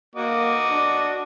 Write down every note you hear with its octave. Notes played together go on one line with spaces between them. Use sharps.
A#3 F#4 D#5 D6
D4